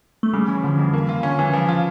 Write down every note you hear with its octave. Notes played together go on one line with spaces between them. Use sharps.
A3
C#3 G3
E3 C#4
D3 F3
F2 E3
A#3
C#3 F4
D3 C#4
E3
C#3 F3
F4